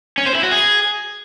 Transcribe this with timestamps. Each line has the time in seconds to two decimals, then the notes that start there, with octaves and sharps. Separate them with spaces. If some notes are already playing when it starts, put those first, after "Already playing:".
0.18 C#4
0.26 C5
0.35 E4
0.43 F#4
0.52 G#4